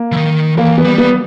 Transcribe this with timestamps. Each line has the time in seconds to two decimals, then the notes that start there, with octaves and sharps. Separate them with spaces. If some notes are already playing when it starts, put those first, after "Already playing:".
Already playing: A#3
0.12 E3
0.16 D#3
0.57 E3 A#3
0.78 B3
0.84 G3
0.98 B3